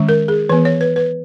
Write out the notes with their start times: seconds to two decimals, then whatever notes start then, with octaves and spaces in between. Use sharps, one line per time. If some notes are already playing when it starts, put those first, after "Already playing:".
Already playing: D#3 G#3 C#4
0.09 A#4
0.28 G#4
0.49 E3 B3 B4
0.65 C#5
0.81 B4
0.96 B4